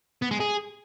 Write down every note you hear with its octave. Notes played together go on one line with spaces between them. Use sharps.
B3
G#3
G#4